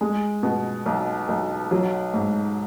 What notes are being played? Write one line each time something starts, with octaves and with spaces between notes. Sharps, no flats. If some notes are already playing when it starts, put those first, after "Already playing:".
G#3
B2
B1
B1
F#3
G#2